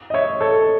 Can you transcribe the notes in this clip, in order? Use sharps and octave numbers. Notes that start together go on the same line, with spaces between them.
D#5
C#5 E5
A4 C#5